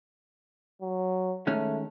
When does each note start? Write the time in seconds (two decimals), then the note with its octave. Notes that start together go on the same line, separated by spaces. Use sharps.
0.82 F#3
1.47 D#3 G#3 A3 C#4